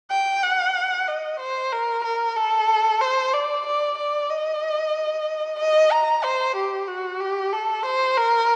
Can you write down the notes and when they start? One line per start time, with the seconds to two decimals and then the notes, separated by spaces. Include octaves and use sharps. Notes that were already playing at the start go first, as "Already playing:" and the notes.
0.11 G5
0.43 F#5
1.07 D#5
1.40 C5
1.72 A#4
2.04 A#4
2.36 A4
3.01 C5
3.33 D5
3.66 D5
3.98 D5
4.30 D#5
5.59 D#5
5.91 A#5
6.23 C5
6.56 G4
6.88 F#4
7.21 G4
7.53 A4
7.85 C5
8.17 A#4